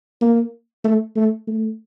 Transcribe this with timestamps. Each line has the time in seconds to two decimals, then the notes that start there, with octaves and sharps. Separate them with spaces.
0.22 A#3
0.84 A3
1.16 A3
1.47 A3